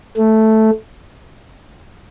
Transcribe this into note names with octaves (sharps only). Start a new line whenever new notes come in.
A3